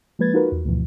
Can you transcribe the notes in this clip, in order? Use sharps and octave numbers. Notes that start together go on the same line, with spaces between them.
F3 G#3 A#3 B4 G#6 A6
D#4 F4 F#4 A#4 B4
E2
D2 G2 B2 E3 F3